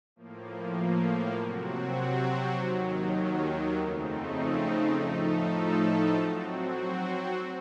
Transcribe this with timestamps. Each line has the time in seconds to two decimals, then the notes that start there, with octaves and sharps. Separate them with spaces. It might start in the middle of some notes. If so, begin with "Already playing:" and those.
0.16 A2 F3 A#3
1.36 C3 F#3 C4 F#4
2.57 D#2 D#3 F#3
3.76 F2 C#3 A3 C4 D#4
4.96 A2 F3 A3 D#4 A4
6.17 F#3 C4 F#4